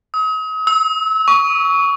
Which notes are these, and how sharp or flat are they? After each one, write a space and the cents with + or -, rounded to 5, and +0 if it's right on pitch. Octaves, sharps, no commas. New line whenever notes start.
D#6 +40
E6 -30
C#6 +20